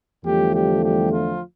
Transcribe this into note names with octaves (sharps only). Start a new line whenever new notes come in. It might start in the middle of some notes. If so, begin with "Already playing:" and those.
E2 D3 F3 G3 A3 G4
G3 G4
G3 G4
F3 F4